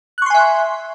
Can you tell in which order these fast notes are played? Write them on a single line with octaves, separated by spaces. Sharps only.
F#6 C#6 C6 G#5 E5